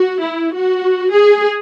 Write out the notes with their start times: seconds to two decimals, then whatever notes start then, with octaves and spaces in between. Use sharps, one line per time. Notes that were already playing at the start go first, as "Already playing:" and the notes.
Already playing: F#4
0.23 E4
0.54 F#4
1.13 G#4